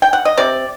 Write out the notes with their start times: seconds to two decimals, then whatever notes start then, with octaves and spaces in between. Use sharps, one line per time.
0.02 G5
0.13 F#5
0.25 D#5
0.37 C3 D5